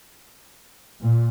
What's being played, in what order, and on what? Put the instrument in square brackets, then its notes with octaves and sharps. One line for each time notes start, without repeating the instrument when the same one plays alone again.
[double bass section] A#2